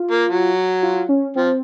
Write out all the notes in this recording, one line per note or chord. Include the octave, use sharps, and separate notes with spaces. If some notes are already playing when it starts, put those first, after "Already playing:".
Already playing: F4
A#3
F#3
F4
C#4
F3 C4